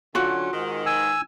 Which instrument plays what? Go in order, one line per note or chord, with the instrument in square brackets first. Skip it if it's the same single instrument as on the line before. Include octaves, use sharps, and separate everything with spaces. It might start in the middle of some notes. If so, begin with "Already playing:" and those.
[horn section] D3 F#3 C#4 [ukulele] F4 F#4
[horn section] G#2 D#3
[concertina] G#5 E6